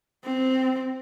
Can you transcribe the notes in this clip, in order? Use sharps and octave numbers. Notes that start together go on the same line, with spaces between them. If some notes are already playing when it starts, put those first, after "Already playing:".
C4